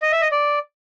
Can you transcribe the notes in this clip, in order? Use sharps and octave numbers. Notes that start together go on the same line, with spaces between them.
D#5
E5
D#5
D5